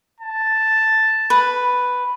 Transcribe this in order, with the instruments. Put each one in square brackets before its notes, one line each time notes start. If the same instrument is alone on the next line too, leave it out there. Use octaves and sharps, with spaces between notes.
[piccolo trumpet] A5
[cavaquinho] B4